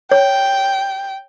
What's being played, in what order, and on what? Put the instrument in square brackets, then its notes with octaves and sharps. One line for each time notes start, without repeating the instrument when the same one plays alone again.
[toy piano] C#5 [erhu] G5